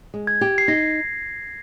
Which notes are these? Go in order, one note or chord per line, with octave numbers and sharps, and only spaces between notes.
G#3
G#6
G4
C7
D#4 A#6